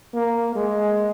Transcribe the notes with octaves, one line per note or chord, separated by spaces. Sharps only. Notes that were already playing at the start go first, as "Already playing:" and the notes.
A#3
G#3